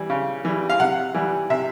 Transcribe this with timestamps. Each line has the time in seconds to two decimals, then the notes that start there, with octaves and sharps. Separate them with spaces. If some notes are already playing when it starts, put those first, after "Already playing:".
Already playing: E3 G3
0.10 C#3
0.45 E3 G3
0.70 F5
0.80 C3 F#5
1.15 E3 G3
1.50 C3 E5